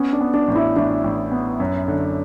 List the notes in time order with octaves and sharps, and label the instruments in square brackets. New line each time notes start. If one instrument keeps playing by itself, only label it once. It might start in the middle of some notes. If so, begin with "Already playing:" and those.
Already playing: [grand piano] B3 [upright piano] C#4
[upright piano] D4
[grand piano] B3
[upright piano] D4
[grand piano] A1
[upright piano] E4
[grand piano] A1 [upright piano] D4
[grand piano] A1
B3
F#2
D3